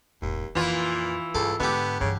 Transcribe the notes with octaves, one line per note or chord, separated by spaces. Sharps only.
E1 A1 D#2
F2 A#2 E3 F4
C#2 G2 A4
G#2 D3 B3 G4
G2 C#3 E3